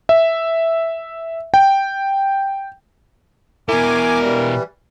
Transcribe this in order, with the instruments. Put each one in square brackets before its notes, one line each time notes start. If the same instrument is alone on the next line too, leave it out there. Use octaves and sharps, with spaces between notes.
[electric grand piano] E5
G5
[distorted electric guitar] B2 E4 [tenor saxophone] A#4 [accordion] G#5 D6
[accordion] E3 G3